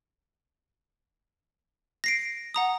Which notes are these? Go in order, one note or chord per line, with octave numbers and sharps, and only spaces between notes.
A#6 C7 D7
F#5 A#5 D#6